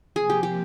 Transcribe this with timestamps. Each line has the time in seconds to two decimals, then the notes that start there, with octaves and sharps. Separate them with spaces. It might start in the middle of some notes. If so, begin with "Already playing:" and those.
0.16 C3 F3 A#3 G#4
0.30 G4
0.43 G4